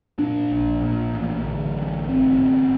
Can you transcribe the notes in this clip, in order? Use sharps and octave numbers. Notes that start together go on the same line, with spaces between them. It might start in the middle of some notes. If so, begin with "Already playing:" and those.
A#2 D4
A#1
A#2
A1
D3
A1
G1 C4
G1